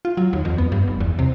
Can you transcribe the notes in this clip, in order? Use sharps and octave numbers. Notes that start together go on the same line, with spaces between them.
F4
F#3
D#2
F2
B3
G2
F1
E2
C3